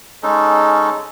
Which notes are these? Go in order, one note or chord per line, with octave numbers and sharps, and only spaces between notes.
G#3 C#4 D#4 A4